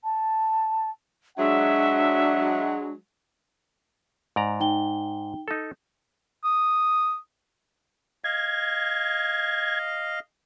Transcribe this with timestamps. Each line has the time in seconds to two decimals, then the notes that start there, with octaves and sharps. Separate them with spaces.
0.04 A5
1.38 F#3 G#3 D4 E5 F#5
4.36 G#2 D5 A#5
4.60 D#4 G5 G7
5.48 D#4 A4
6.44 D#6
8.24 D#5 F5 G#6